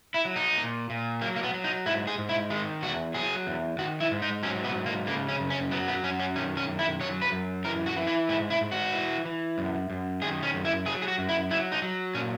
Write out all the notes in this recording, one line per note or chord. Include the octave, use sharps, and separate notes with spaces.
E4
F#3
D#4
A#2
A#2
F#3 A#3
A#3
B3
F#3
D#4
G#2 E4
G#4
G#2
E4
D#3 G#3
E2 F#4
F#3 G#4
E2
D#3 F#4
E4
G#2
D#4
F#3 C#4
B3
G#2
A#3
C#3 A#3
C#4
F#2
C#4
F#3 B3
B3
F#2 C#4
C#4
D#3 C#4
C#4
F#2
E4
F#3 C#5
B4
F#2
E3 A#4
F#4
E3
E4
G#2 E4
E4
G#2
F#4
E3
E3
F#2
F#2
D#3 G#4
C#4
F#2
E4
F#3 G#4
G#4
F#4
F#2
E4
F#3 E4
D#4
F#3
A#2 C#4